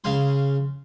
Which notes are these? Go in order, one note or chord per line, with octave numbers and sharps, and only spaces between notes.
C#3 F5 G#5 C6